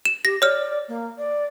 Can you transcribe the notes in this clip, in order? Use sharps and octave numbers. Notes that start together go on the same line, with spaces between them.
E7
G4 A#6
C#5 D5 F6
A#3
D5